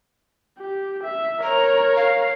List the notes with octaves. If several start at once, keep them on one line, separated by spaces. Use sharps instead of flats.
G4
E5
A#4 C#5 A#5
F5